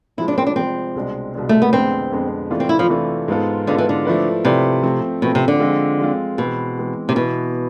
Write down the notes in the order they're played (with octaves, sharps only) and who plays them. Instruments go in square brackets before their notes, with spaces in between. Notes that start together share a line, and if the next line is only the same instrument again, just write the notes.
[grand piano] C3 F3 G#3 [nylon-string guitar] E4
[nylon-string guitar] D4
C4
D4
[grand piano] C3 F3 G#3 [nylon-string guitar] C4
[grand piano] C2 B2 G#3 D4
C2 B2 G#3 D4
[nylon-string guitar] A3
B3
[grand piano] F2 D3 G#3 B3 [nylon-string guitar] C4
[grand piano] F2 D3 G#3 B3
C3 E3 A3 D4 F4
[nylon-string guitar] C4
E4
F3
[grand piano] C3 E3 A3 D4 F4
G#2 G#3 B3 F4 A4
[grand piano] G#2 G#3 B3 F4 A4 [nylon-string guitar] D3
[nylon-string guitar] E3
D3
[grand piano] F3 A3 E4 B4 D5
[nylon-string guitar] C3 [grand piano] F3 A3 E4 B4 D5
[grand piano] F3 A3 C4
[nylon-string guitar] B2 [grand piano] F3 A3 C4
[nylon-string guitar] C3
D3
[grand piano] F3 G#3 C4 F4
F3 G#3 C4 F4
[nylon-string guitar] B2 [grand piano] E3 G#3 C4
[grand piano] E3 G#3 C4
[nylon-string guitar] C3
[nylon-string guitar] B2 [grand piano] E3 B3 E4